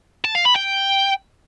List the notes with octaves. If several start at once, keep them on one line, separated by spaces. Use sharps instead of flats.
A5
F5
B5
G5